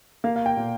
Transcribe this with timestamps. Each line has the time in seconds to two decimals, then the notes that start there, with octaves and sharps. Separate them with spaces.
0.24 A#3 F5
0.36 F5
0.46 G5
0.57 A#2